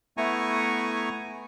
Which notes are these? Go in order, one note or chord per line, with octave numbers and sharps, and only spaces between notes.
A3 B3 E4 G#5 A#5 C#6